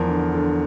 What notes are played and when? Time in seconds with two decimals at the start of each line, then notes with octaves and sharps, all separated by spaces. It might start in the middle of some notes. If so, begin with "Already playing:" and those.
Already playing: E2 F3 A#4
0.08 D3
0.35 D3